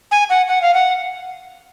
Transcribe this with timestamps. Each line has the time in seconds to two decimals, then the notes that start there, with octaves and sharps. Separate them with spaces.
0.11 G#5
0.30 F#5
0.48 F#5
0.62 F5
0.74 F#5